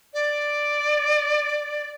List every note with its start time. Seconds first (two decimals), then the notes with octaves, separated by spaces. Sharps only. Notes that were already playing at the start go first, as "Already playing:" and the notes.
0.14 D5